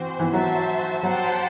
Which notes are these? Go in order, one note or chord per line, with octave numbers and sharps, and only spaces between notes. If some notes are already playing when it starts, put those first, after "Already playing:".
Already playing: E3 C4 F#4 C5
E3
F#3 F#4 C5 E5 A5
F#3 G4 C5 F#5 A5